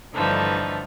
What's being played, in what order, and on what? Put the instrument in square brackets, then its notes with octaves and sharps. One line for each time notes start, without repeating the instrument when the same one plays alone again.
[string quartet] G2 D3 E3 F3 A3 D#4